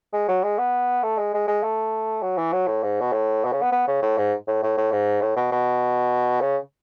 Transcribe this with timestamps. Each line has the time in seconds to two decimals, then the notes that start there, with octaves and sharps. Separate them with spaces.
0.13 G#3
0.28 F#3
0.43 G#3
0.58 B3
1.03 A3
1.18 G#3
1.34 G#3
1.48 G#3
1.63 A3
2.22 F#3
2.37 E3
2.53 F#3
2.67 A2
2.83 G#2
3.01 B2
3.13 A2
3.45 B2
3.53 C#3
3.62 B3
3.72 B3
3.87 C#3
4.02 A2
4.18 G#2
4.47 A2
4.63 A2
4.78 A2
4.92 G#2
5.22 A2
5.36 B2
5.52 B2
6.41 C#3